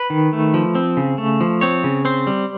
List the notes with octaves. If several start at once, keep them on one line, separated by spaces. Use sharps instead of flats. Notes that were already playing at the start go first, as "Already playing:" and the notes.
Already playing: B4
D#3
A3
F3
C4
C#3
A3
F3
C4 C#5
C#3
C4 C5
G3